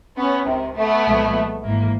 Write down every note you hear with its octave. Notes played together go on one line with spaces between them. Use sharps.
B3 C#4
C#2 C3 D#3
A3 B3
C2 A#2 F3 G#3
G#1 G#2 E3 A#3